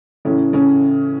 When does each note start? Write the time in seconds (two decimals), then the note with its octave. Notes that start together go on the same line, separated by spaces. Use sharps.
0.25 A2 C#3 E3 C#4
0.53 C#3 C#4